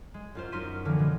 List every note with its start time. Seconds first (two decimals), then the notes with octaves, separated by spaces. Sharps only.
0.14 G#3
0.35 F#2 F4 C5
0.52 F#2 D#4 C6 F6 B6 D#7
0.85 D3 E3 F3 A#3
0.99 B2 G#3 B3